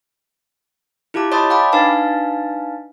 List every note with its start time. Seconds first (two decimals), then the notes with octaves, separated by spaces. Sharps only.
1.14 E4 F4 G4 A5 D6
1.32 C#5 D#5 A5 B5 C6 D#6
1.50 F5 G5 A5 B5 D6
1.73 D4 D#4 B4 F5 G#5 A5